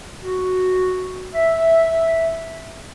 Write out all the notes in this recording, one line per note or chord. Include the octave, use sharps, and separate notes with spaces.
F#4
E5